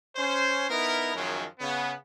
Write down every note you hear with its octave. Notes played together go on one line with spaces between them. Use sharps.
C#4 C5
B3 D#4 E4 A#4
F#2 D#3 F3 F#3 G#3
C#3 B3